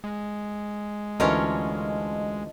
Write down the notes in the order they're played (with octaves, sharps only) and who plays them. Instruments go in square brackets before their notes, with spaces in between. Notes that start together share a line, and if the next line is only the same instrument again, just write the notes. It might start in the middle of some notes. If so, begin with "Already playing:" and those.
[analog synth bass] G#3
[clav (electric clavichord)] D2 E3 [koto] C#4 F4 A#4 [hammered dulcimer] D#5 A5 C#6